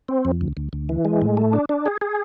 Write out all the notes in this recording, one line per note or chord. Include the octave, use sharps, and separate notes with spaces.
C4
F2
D2
D2
D2
E3
G#3
A2
A3
D4
D4
G#4
G#4